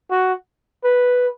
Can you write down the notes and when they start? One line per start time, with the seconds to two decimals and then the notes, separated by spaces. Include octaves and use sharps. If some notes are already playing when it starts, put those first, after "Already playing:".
0.11 F#4
0.84 B4